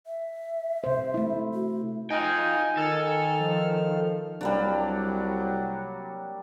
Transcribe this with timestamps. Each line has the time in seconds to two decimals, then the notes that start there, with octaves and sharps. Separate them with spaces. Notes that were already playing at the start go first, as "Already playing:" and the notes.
0.06 E5
0.84 C3 C5
1.14 A3 E4
1.54 F#4
2.11 D#4 F4 D#5 G5 G#5
2.78 D#3 A4 F6
3.40 F3
4.41 C2 F#3 G3 A#3 D4